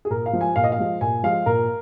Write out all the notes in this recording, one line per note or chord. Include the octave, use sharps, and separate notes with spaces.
G#4
A#2 A#4
F5
F3 G#3
G#5
A#2 F5
D#5
F5
F3 G#3
A#2 G#5
F3 G#3 F5
A#2 A#4